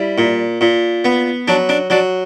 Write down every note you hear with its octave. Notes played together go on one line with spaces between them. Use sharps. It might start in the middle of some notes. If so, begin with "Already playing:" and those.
Already playing: G3 E4
A#2
A#2
B3
F#3 D4
D4
F#3 D4